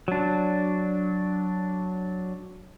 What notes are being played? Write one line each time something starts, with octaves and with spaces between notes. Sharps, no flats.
F#3 D4